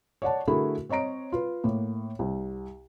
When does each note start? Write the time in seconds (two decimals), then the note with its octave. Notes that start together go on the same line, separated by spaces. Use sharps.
0.22 C#5 D5 F#5 A5
0.47 D3 A3 E4 F#4 G#4 A#4
0.89 C4 C#5 D#5 A#5 D7
1.32 F4 B4
1.64 A2 A#3
2.19 C2